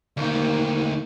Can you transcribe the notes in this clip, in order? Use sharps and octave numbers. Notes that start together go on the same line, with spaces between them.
D2 D#3 A#3